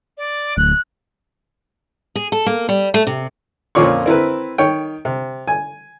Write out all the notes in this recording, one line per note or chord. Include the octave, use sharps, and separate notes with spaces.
D5
D1 F#6
G#4
A4
A#3
G3
A3
C3
F2 A#2 C#4 F4 D5 C#6
C4 E4 A#4 B4
D#3 C#5 G5
C3
G#5